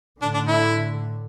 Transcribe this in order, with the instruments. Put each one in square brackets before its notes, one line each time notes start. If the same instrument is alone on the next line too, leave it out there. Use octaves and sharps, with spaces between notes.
[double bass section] A2 D3 [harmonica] D4
[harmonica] D4
E4